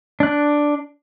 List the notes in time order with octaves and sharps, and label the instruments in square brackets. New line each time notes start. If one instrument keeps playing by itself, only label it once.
[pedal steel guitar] D4 F#6